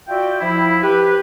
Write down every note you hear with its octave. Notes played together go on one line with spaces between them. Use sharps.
F4 F#4 D5 E5 G5
F3 E4
G4 B4